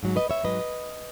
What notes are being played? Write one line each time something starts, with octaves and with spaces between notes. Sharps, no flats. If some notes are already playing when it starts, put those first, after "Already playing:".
G#2 F#3
B4 D#5
C#5 E5
G#2 F#3 B4 D#5